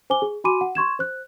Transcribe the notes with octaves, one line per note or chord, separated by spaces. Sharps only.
C5 G#5 D6 G7
G#4
F#4 G#5 B5 C6 D6 D#7
F#5
C6 C#6 G#6 E7
C5 F#6